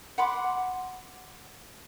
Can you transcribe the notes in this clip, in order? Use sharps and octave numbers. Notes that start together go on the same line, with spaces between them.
F#5 B5 C6 D6